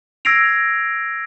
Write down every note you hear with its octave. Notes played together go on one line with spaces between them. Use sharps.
E6 G#6 A#6 C7 D7 F7